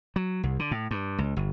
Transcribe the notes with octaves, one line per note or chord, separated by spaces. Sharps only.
F#3
C2
D3
A2
G2
C#2
G1